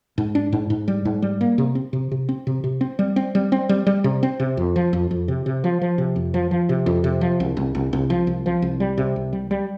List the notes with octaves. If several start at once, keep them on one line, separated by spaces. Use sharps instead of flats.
G#2
D4
G#2
G#2
G3
G#2
G3
A#3
C3
C4
C3
C3
C4
C3
C3
C4
G3
C4
G3
C4
G3
G3
C3
C4
C3
F2
F3
F2
F2
C3
C3
F3
F3
C3
F2
F3
F3
C3
F2
C3
F3
C2
C2
C2
C2
F3
C2
F3
C2
G3
C3
C2
G3
G3